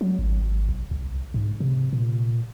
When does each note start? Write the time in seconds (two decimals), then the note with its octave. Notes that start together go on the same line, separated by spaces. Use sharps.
0.01 F#3
0.19 G#1
0.69 B1
0.91 C2
1.34 G#2
1.60 C3
1.93 A#2